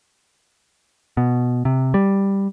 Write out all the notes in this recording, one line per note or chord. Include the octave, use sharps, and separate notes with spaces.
B2
C3
G3